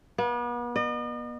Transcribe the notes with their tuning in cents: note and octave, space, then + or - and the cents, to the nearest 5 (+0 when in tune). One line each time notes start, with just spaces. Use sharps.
B3 -40
D#5 -40